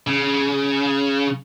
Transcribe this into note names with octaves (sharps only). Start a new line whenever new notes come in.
C#3